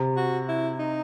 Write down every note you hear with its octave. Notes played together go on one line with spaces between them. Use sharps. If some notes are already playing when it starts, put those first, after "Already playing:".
Already playing: C3
F#4
E4
D#4